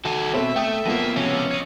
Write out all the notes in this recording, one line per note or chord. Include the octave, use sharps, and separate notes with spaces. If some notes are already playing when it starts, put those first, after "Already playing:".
D#3 F#4 A4 G#5
B2 C4 A4 C5 E5
A3 G5 D#6
F2 F3 A#3 B3 D#7
C#2 C3 C#4
C#5 D#5